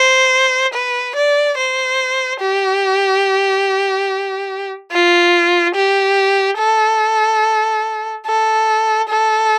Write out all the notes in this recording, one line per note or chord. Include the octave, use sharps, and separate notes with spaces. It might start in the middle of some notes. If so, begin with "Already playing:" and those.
Already playing: C5
B4
D5
C5
G4
F4
G4
A4
A4
A4